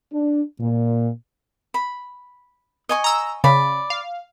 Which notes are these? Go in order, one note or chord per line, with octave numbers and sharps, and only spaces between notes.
D4
A#2
B5
D#5 G#5 C#6
A#5 E6
C#3 D5 B5
F5